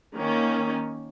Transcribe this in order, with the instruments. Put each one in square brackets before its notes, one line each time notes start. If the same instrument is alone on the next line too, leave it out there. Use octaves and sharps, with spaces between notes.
[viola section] D#3 A#3 C#4